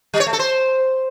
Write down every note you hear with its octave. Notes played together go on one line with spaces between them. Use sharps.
G3
C#5
A3
A4
C5